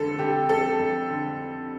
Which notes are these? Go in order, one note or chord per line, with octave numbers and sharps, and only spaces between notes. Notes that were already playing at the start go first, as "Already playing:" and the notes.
Already playing: F2 D3 A4
D3 G4
F2 A4
F2
D3